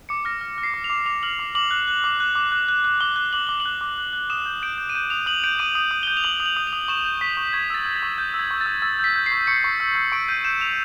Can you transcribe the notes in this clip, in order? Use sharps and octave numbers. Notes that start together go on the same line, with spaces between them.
D6 C#7
F6 A#6
F6
F6
C7
D6
F7
D6
D6 F7
F6 F#7
D6
D6 F#7
F#6
F#6
D6
F#6
D6
F#6
F#6
F#6
D6 G7
F#6
D6 F#7
D6 G7
F#7
F#6
D6
F#6
F#6
D#6 E7
G6
G6 D7
G6
D#7
G6 E7
D#6 F7
D#6 F#7
G6 D7
D#6 D#7
D#6
D#6
G6 G7
F7
D#6 F#7
D#6
F#7
D#6
F7
D#6
C#6 E7
G6
C#6 B6
C#6
C#6 G#6
E6 A6
E6
G#6
C#6
G6
E6
G#6
C#6
A6
E6
E6 A6
G6 B6
G6
C7
C#6
C#6 C#7
C#6
E6
E6
C#6 D7
G6 D#7
G6 E7
E6 F7